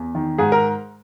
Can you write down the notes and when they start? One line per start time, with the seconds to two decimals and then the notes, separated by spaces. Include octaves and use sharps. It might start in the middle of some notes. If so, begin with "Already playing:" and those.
Already playing: E2
0.15 D#3
0.38 G#2 G#4
0.52 A#4